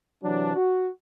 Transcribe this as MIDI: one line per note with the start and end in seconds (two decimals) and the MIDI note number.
0.24 0.55 48
0.24 0.55 52
0.24 0.55 54
0.24 0.55 62
0.56 0.87 66